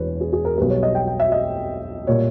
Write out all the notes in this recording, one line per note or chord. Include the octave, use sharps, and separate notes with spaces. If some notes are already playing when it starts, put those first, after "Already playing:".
Already playing: E1 E2 E3 B4 C#5
G#4
G#4
A#4
B1 B2 G3 B4
C#5
D#5
G5
G5
E5
D#5
A#2 G3 C#5